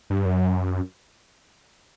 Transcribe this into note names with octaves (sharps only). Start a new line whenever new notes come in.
G2
F#2